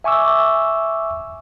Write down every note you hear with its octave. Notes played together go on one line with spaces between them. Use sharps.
E5 G#5 C#6 D6 E6